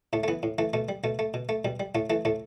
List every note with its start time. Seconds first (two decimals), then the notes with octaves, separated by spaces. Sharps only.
0.13 A2 A3
0.24 A3
0.28 E3 B3
0.43 A2
0.58 E3 A3
0.73 B2 A3
0.89 G3
1.04 B2 A3
1.19 A3
1.34 B2
1.49 A3
1.65 B2 G3
1.80 G3
1.95 A2 A3
2.10 E3 A3
2.25 A2 A3